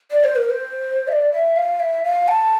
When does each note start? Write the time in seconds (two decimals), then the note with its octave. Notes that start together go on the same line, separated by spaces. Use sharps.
0.11 D5
0.24 C5
0.36 A#4
0.50 C5
1.08 E5
1.12 D5
1.32 E5
1.56 F5
1.80 E5
2.04 F5
2.28 A5